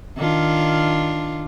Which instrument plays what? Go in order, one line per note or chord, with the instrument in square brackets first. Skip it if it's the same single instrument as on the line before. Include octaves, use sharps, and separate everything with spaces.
[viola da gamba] D#3 D4 F4